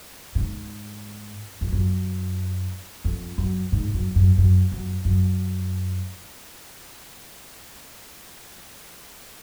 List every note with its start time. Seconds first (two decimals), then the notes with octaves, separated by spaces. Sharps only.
0.35 A2
0.38 G#2
1.61 F2
1.73 F#2
3.05 F2
3.38 F#2
3.72 G#2
3.94 F#2
4.15 F#2
4.38 F#2
4.72 F#2
5.05 F#2